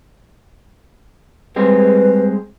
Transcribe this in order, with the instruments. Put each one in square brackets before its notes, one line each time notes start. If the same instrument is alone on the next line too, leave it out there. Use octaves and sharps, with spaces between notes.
[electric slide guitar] G3 G#3 C4 [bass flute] B4